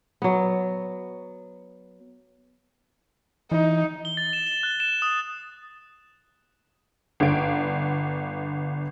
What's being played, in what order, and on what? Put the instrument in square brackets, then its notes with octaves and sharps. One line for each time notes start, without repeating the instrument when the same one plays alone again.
[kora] F#3 B3
[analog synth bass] E3 [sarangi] D#4
[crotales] G7
A6
E7
G7
F#6
E7
D#6
[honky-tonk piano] G1 D3 F5 D7